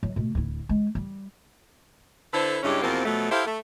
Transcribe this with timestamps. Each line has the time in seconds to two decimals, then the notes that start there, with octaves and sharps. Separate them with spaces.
0.03 F#3
0.16 B2 A3
0.35 D1 E4
0.69 G#3
0.95 G3
2.33 D3 E4 A4 B4 C5
2.63 G2 C#3 G#3 C#4 E4 G4
2.82 E2 B2 F3 A#3 C4
3.05 B2 F3 F#3 A3
3.30 E4 G4 A4 C5 E5 F5
3.46 A3